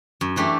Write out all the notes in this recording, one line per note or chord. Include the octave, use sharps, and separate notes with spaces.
F#2
E3 A3 D4 G4